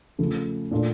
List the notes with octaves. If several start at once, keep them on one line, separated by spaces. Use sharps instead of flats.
C#3 F3 A3
A#2 A3 D4 F4